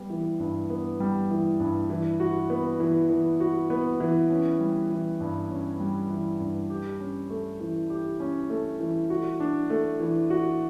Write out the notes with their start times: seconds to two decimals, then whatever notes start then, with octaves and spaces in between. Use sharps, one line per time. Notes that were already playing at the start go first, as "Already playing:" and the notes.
Already playing: G3 B3
0.10 E3
0.40 G2
0.70 B3
1.00 G3
1.30 E3
1.60 G2
1.90 E3
2.20 F#4
2.50 B3
2.80 E3
3.10 E3
3.40 F#4
3.70 B3
4.00 E3
4.30 C#4
4.60 G3
4.90 E3
5.20 G2
5.50 C#4
5.80 G3
6.10 E3
6.40 G2
6.70 G4
7.00 C#4
7.30 A3
7.60 E3
7.90 G4
8.20 C#4
8.50 A3
8.80 E3
9.10 F#4
9.40 D4
9.70 A3
10.00 E3
10.30 F#4